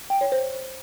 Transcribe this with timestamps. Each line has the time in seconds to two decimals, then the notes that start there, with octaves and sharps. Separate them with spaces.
0.10 G5
0.21 C#5
0.32 C5